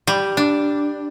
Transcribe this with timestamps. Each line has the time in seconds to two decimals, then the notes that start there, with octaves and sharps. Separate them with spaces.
0.07 G3
0.37 D4